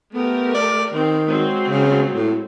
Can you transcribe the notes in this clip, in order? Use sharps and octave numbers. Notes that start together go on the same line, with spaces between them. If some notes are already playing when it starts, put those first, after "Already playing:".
A3 B3 G4 A#4
D5
D#3 C4
F#3 G#3 C4
C#3
A2